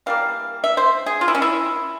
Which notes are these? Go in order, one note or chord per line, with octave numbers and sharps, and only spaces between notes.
E3 G3 A#3 F5
E5
C5
G#4
F4
E4
C#4
E4